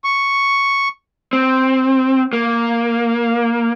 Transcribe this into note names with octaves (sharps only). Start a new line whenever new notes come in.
C#6
C4
A#3